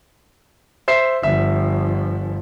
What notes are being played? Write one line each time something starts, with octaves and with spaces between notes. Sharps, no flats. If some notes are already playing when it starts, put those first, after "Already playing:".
C5 E5 C7
G1 F3 E5